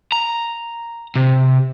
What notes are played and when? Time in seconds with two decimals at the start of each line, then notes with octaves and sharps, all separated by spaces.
0.12 A#5
1.16 C3